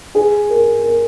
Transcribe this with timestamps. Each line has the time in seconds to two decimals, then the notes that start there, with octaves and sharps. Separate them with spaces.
0.15 G#4
0.50 A#4
0.84 A#4